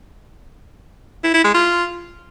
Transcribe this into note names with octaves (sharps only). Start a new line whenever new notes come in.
E4
E4
G#3
F4